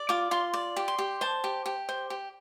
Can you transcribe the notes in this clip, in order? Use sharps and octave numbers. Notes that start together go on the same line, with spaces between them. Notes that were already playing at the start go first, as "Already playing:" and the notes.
Already playing: D5
F4 D6
F4 C6
D5
G4
C6
G4
C5 A5
G4
G4
C5
G4